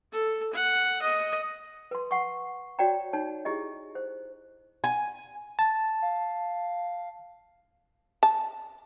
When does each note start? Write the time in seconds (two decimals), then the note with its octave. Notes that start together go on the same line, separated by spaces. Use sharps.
0.12 A4
0.53 F#5
1.02 D#5
1.91 B4 C6
2.11 F#5 C#6
2.79 F#4 C#5 D5 G5 A#5
3.13 D#4 C#5 A5
3.45 E4 G4 G#4 D#5
3.95 C5
4.84 G#5
5.59 A5
6.02 F5
8.23 A5